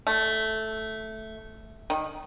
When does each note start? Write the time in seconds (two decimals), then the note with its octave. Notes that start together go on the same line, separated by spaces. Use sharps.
0.07 A3
1.90 D#3